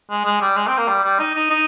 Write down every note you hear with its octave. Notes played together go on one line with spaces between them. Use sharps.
G#3
G#3
G3
G#3
C4
A#3
G3
G3
D#4
D#4
D#4